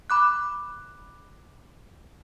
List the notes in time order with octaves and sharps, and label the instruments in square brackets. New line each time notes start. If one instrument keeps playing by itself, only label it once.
[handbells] B5 D6 F#6